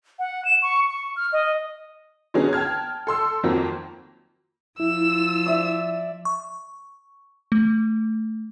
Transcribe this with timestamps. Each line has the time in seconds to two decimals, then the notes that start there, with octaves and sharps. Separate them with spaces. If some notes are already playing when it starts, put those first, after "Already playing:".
0.19 F#5
0.45 E7
0.62 C#6
0.90 C#6
1.16 F6
1.33 D#5
2.34 D3 F#3 B3 C#4 D#4 G#4
2.53 G5 A5 F6 G#6
3.07 A4 C6 E6
3.43 F2 D#3 F#3 A#3 C4
4.80 F3 E4 E6
5.46 D5 E5
6.25 C#6
7.52 A3